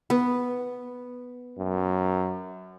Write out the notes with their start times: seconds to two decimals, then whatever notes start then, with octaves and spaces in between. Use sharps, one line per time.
0.10 B3
1.59 F#2